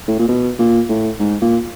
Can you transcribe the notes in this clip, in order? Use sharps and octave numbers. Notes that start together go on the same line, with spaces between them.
A2
A#2
B2
A#2
A2
G#2
A#2